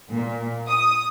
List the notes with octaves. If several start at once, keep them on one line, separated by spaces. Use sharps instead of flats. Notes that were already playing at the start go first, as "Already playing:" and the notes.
A#2
D#6